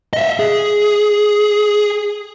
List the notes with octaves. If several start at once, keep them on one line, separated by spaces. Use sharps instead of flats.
D#5 E5
G#4